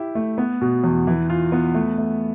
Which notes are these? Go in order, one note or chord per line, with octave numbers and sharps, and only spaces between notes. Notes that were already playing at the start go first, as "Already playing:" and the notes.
Already playing: E4 G4
A3
B3
B2
E2
E3
F4
B3
A3
A3